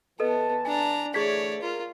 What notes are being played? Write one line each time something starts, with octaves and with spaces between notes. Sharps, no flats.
E2 E3 B3 A4 B4 D#5 A5
D4 G#5 A#5
D3 E3 A3 G#4 C#5 D5 G#6 B6
F4 A#4